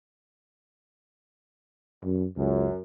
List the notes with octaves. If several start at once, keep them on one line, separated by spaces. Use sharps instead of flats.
F#2
C#2 F#2